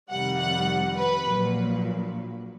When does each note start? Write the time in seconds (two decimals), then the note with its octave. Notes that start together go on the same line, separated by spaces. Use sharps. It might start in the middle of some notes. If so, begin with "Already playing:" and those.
0.10 F2 C3 D#3 G3 F#5
0.39 F#5
0.96 B4
1.24 A#1 A#2 F#3